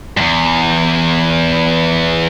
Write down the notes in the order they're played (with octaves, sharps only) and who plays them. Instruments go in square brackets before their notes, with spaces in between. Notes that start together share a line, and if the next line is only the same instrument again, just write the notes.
[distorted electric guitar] E2 G2